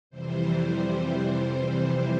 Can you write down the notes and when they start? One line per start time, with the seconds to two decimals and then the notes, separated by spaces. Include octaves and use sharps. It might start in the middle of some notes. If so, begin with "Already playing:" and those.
0.10 F2 C3 E3 G3 C5
1.48 C5